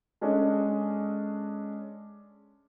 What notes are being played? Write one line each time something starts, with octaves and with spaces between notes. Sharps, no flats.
G#3 C#4 D4 A4 D#5